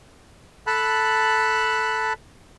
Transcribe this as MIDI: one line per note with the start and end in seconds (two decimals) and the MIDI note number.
0.67 2.13 69
0.67 2.13 81
0.67 2.13 83
0.67 2.13 90